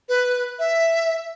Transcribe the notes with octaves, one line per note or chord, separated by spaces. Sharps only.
B4
E5